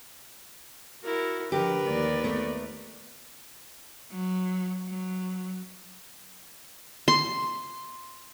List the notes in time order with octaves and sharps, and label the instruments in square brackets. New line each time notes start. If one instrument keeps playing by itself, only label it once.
[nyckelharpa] E4 A#4 [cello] F#4
[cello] D3 F3 [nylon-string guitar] G4 [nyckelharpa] A#4 B4
[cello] D#2 D5
[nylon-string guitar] A3 B3
[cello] F#3
F#3
[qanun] C6